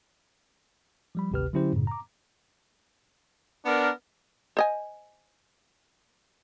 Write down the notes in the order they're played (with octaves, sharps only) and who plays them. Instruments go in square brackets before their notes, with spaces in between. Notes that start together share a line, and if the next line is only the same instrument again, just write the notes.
[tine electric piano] F3 G3 B5
G#1 D2 C3 G4 B4 F6
D3 F#3 C#4 E4 G4 C5
F#2 A2 C#3
A#5 D6
[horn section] B3 A#4 [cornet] D4
[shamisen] C5 D#5 G#5